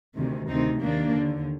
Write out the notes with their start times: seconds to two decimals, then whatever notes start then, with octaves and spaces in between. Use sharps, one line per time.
0.15 D2 C3 D#3
0.48 D2 C3 D#3 C4 D#4
0.82 D#2 D#3 A#3 D4
1.15 D#2 D3